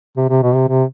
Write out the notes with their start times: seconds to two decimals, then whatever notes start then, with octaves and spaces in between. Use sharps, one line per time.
0.17 C3
0.30 C3
0.42 B2
0.55 C3
0.68 C3